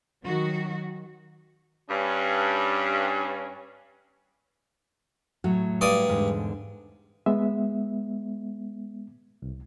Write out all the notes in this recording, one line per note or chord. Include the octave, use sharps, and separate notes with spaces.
D#3 F#3 F#4
G2 C#4
A2 F#3 F#4
G2 D5 D#6
E2 G#2 D3
G#3 B3 E5
C2